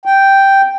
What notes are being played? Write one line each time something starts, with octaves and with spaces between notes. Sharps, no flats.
G5